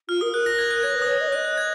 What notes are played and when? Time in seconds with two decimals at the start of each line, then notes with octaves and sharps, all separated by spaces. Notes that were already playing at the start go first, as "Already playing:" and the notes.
0.09 F4 F6
0.21 A#4 D#6
0.33 A#4 F#6
0.46 A#6
0.59 G#6
0.71 F#6
0.83 C#5 G#6
0.95 B4
1.02 D#6
1.08 C#5
1.21 D#5
1.28 C#5
1.32 D#5 F#6
1.44 F#6
1.57 G#6